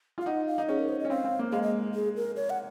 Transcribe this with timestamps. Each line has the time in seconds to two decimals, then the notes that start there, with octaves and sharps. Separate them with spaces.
0.18 F4
0.21 F5
0.26 D#4 F#5
0.47 F5
0.58 D#4
0.68 C#4 G#4
0.79 A#4
0.89 C5
1.00 D#5
1.05 C#4
1.10 C4 F5
1.24 C4
1.39 A#3
1.52 G#3 F5
1.63 D#5
1.94 G#4
2.16 A#4
2.36 C#5
2.50 F#5